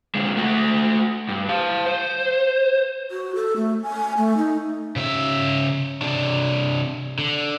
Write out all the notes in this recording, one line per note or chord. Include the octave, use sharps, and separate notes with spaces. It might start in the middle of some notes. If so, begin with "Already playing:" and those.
D3 G#3
A3 F#4
G2
F5 A5
C5
F#4
A4
A3
G#5
A3
D#4
C#3 E5
C3 D4
D3